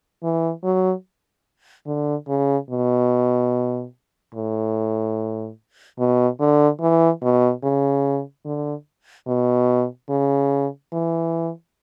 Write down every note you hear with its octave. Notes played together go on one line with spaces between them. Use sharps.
E3
F#3
D3
C#3
B2
A2
B2
D3
E3
B2
C#3
D3
B2
C#3
E3